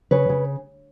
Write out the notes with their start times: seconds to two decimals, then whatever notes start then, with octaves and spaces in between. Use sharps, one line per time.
0.11 C#3 B4 C#5
0.29 C#3